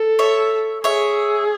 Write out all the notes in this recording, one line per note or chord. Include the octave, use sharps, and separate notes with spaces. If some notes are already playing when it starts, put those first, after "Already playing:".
Already playing: A4
C#5 E5
G#4 C#5 E5